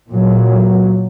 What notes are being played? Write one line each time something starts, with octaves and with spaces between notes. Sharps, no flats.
A#2 F#3